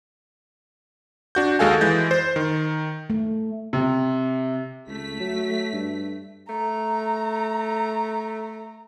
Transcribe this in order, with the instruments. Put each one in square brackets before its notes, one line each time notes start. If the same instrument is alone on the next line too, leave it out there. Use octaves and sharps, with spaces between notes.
[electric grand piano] D4 F#4 G6
D#2 G#3 F#4 A4 F5 G#5
E3 G#3 G6 A6
C5
D#3
[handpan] A3
[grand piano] C3
[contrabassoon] C#2 [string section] A3 B6
[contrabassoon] F#3
G2
[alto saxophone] A3 [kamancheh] A#5